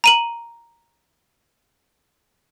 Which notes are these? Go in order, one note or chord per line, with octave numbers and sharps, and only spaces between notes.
A#5 D#7 F#7